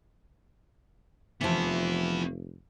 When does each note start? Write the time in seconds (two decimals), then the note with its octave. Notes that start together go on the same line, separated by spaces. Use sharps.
1.41 F1 E3 F3 B3 E4